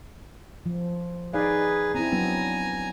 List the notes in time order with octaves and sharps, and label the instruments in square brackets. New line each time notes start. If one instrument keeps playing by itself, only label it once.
[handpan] F3
[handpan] D#4 D5 F5 [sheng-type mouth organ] G#4 B4
[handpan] C4 E4 [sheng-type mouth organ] G#5 A#5
[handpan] F#3 B3 D4